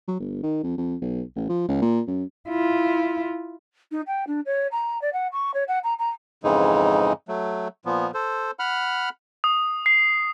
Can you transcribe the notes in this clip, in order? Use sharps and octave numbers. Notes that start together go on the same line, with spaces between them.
F#3
G1
D#3
F2
F2
B1
A1
F3
C#2
A#2
F#2
E4 F4
D#4
G5
D4
C#5
A#5
D5
F#5
C#6
C#5
F#5
A#5
A#5
F2 G#2 C#3 E3 G#3 D#4
F#3 A3
A#2 F3 B3
A4 C5
F#5 B5 F6
D#6
C7